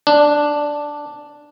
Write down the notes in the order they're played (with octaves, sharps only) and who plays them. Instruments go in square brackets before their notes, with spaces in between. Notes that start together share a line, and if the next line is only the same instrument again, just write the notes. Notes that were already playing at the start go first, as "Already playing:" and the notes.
[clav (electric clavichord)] D4